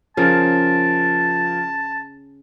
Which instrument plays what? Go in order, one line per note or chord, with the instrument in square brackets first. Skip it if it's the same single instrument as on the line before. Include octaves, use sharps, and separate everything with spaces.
[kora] C#3 [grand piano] F3 A#4 [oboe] A5